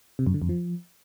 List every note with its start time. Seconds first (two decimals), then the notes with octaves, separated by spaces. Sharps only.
0.19 C3
0.27 F#2
0.34 D3
0.42 F2
0.49 F3